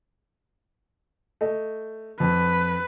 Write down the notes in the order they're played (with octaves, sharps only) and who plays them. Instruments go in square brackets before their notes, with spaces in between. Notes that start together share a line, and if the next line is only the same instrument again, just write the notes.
[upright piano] A3 D#5
[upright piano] F2 [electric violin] B4